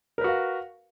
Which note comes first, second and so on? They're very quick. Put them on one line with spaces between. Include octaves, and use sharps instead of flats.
A#4 B4 F#4 F5